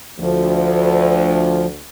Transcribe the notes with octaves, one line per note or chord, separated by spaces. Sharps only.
D2 F3